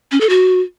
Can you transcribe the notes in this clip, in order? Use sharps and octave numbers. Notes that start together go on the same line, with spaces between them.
C#4
A4
F#4